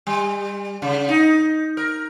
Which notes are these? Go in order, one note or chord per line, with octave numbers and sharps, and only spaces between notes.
G3
C#3
D#4
A#4